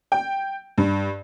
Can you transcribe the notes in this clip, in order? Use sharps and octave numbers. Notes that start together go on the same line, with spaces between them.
G5
G2